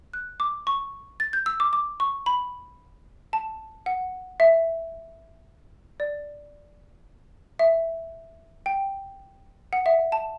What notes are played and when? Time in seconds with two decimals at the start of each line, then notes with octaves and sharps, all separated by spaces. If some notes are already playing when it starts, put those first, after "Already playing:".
0.13 F#6
0.40 D6
0.67 C#6
1.20 A6
1.33 G6
1.46 E6
1.60 D6
1.73 D6
2.00 C#6
2.26 B5
3.33 A5
3.86 F#5
4.40 E5
6.00 D5
7.59 E5
8.66 G5
9.73 F#5
9.86 E5
10.12 A5